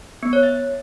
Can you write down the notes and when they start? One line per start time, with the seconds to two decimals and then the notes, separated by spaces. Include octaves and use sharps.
0.23 B3
0.33 C#5
0.43 E5